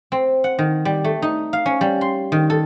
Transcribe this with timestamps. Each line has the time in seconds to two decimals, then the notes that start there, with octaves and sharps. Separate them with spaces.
0.12 C4
0.44 F#5
0.59 D#3
0.85 G3
1.04 A3
1.22 D#4
1.53 F5
1.66 C#4
1.81 G3
2.01 C6
2.32 D#3
2.50 A4